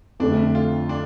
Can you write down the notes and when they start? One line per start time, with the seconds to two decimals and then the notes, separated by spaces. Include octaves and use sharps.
0.20 F2 D3 A3 C4 D4
0.55 F4
0.89 D4